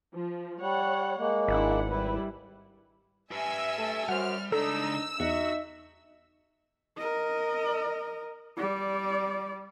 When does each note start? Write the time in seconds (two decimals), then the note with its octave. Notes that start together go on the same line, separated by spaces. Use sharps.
0.13 F3
0.61 G3 C#5 F#5
1.17 G#3 A#3
1.48 G#1 D4 E4 F#5
1.89 G3 E4 B4
3.31 G4 B4 E5 G#5 E6
3.78 A3 A4
4.08 F#2 G3 F#4 C5 F#5 F6
4.52 C#2 D4 D#4 A4 A#5 E6
5.20 E2 D#4 F#4 E5
6.98 A#4 D#5
8.57 G3 D5